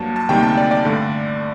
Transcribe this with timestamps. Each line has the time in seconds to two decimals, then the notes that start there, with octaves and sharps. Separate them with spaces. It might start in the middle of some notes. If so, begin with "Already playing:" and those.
Already playing: G2 F#3 A#3 A5
0.16 A5
0.29 D2 C3 D#3 G3 A#3 G5
0.43 A5
0.57 D5
0.71 D5
0.85 G2 D3 A3